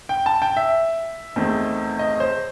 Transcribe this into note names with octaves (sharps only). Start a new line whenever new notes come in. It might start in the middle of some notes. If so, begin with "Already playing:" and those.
G5
A5
G5
E5
E2 D#3 A3 C4
D#5
C5